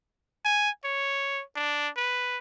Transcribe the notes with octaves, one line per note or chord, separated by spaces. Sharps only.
G#5
C#5
D4
B4